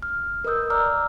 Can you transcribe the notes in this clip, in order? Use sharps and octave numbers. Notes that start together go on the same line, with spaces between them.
F6
A#4 B4 D#5 D#6 E6 G6
D5 A#5 D6 E6 F6